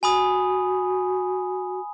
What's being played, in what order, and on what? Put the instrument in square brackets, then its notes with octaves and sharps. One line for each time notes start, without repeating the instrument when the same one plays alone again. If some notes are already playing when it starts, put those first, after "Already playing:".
[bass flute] F#4 [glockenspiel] G#5 B5 D#6